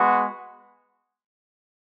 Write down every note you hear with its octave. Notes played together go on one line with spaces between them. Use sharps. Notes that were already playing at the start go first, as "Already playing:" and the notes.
Already playing: G#3 B3 F#4